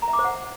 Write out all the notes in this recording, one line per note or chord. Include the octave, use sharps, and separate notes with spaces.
A#5
E5
D6
C5
F#5